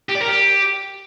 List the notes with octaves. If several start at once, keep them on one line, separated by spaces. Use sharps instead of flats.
G4
D5
A#4
G4